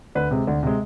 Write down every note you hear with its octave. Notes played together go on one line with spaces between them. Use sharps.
D2 B4
C3 G#3
D2
C3 G#3